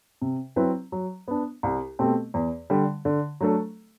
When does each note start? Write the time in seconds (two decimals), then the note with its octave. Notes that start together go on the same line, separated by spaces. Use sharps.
0.21 C3
0.56 F#3 C4 E4 B4
0.92 F#3
1.28 B3 D4
1.63 C2
1.99 B2 A3 C4 G4
2.34 E2
2.70 D3 G3
3.05 D3
3.40 F#3 A3 D4 A4